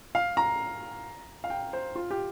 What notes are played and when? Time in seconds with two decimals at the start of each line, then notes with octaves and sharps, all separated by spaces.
0.15 F5
0.37 A#5
1.44 F5
1.50 G5
1.73 C5
1.95 F4
2.11 G4